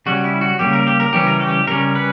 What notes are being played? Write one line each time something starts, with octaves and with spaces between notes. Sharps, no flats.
C#3 G3 C#4 F#4
E4
F#4
C#3 G3 A#3 G4
A#4
G4
A#4
C#3 E3 G3 C#4 G4
A#4
G4
C#3 G3 C#4 A#4
B4